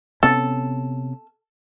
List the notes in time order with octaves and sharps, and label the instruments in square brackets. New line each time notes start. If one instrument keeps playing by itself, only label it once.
[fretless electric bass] C3 B3 C#4 [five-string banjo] A4